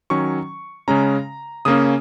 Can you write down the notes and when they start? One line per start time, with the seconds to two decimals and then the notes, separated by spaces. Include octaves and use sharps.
0.10 D#3 F#3 C#4 C#6
0.88 C#3 G#3 C#4 A#5
1.65 C#3 A#3 C#4 D#6